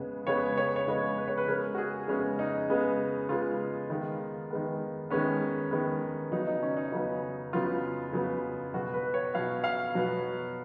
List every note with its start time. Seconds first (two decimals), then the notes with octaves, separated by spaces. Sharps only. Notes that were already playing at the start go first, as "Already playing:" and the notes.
Already playing: C#3 G#3 B3
0.27 C#3 G#3 B3 C#5
0.57 C#5
0.76 C#5
0.88 C#3 G#3 B3 D#5
1.18 B4
1.28 C#5
1.37 B4
1.48 C#3 G#3 B3 A#4
1.74 F#4
1.78 G#4
2.08 C#3 G#3 B3 C#4
2.39 D#4
2.70 C#3 G#3 B3
3.29 C#3 G#3 B3 F4
3.90 D#3 G#3 B3
4.51 D#3 G#3 B3
5.10 D#3 G#3 B3 C#4
5.71 D#3 G#3 B3
6.31 C#3 F#3 B3 D#4
6.47 D#4
6.63 C#4
6.77 D#4
6.92 C#3 F#3 B3
7.53 C#3 F#3 B3 F4
8.13 C#3 F#3 B3
8.74 B2 F#3 B3 F#4
8.94 B4
9.14 C#5
9.34 B2 F#3 B3 F5
9.64 F5
9.95 B2 F#3 B3